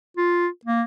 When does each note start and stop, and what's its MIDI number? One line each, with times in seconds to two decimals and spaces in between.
0.17 0.47 65
0.65 0.83 58